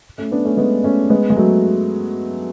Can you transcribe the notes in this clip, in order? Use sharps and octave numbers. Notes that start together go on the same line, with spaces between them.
A3 C#4
B3 D4
A3 C#4
G#3 B3
A3 C#4
G#3 B3
G#3
F#3 A3